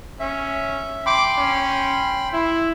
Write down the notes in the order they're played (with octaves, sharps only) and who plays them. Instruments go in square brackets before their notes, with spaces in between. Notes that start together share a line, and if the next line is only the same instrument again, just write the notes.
[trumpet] C#4 [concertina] E5
[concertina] G5 B5 C6 [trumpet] D6
[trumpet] C#4
E4